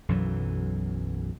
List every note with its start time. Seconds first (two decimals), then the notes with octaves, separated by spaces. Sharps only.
0.09 B1 F#2 E3 F#3